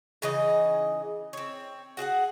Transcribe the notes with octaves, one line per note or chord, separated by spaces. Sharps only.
C#3 E3 D#4 D#5
C4 C#5
F#4 G#4 E5 F#5